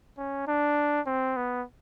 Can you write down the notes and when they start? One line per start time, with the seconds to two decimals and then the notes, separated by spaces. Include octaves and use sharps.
0.18 C#4
0.47 D4
1.07 C4
1.37 B3